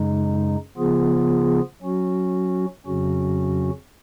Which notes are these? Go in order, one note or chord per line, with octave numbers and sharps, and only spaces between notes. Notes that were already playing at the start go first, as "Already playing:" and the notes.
Already playing: F#2 C#3 G#3 D#4
C#3 F3 B3 F4 G#4
F#3 C#4 F#4
F2 C#3 F#3 C#4 F#4